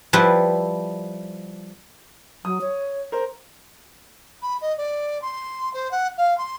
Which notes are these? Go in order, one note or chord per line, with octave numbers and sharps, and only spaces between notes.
F3 G3 E4 B4
F#3 D#6
C#5
A#4 C5
B5
D#5
D5
C6
C5
F#5
F5
C6